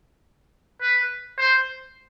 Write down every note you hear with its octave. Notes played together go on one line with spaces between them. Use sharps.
B4
C5